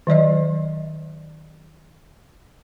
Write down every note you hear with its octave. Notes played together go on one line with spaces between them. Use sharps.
D#3 F#3 D5 D#5